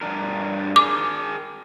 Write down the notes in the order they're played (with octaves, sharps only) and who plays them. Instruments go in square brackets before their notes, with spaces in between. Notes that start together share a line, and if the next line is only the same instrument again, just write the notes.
[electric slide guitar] G2 D4 A#4
[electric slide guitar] G#4 A#4 G#5 [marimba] D6